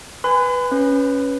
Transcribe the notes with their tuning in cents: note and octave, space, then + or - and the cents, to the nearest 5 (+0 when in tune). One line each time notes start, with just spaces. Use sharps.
B4 +0 G#5 -15 B5 +45
C#4 +0 B4 +0